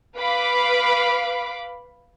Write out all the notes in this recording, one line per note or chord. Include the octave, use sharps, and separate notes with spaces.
B4 F5 B5 D6